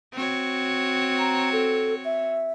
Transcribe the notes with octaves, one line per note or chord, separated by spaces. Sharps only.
C4 F#4 C#5
A#5
A4
E5